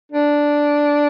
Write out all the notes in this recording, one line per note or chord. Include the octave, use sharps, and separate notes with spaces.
D4